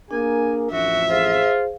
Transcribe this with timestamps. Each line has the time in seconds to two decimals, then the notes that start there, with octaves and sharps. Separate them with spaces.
0.11 A#3 D4 G#4 A#4 G#5
0.72 A1 F2 F3 F#4 E5
1.09 F4 G#4 C5 F5